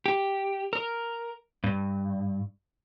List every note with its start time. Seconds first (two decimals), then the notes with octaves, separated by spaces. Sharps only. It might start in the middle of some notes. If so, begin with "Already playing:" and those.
0.06 G4
0.73 A#4
1.64 G2